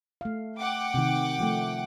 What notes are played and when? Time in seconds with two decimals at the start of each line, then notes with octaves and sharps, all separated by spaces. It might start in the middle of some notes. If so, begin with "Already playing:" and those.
0.21 A3 F5
0.58 F#5 G5 D6
0.94 C3 D#3
1.39 F3 A3